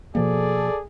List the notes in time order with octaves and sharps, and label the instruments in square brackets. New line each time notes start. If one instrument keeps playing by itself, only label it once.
[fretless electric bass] B2 F3 A#3 [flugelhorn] G#4 [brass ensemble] A4 D5